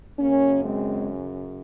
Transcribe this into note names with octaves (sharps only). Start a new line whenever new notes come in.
F#2 C#3 A#3 C#4
G#3 C4